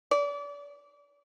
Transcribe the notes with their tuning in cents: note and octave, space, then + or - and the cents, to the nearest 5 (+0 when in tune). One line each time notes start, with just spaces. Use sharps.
D5 -35